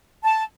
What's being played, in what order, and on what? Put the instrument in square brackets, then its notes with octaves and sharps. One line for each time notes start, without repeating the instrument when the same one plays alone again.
[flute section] A5